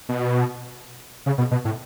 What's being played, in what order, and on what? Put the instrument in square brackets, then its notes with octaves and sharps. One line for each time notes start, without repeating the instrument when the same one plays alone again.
[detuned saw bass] B2
C#3
B2
B2
A2